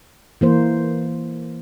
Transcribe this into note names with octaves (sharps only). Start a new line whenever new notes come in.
E3 A#3 C5